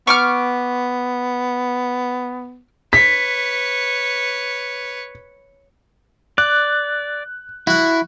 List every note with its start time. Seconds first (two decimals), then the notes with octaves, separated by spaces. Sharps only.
0.07 B3 C#6 D6 F6
2.93 B4 C#5 B6
6.38 D5 F#6
7.67 E4 F#4 F#5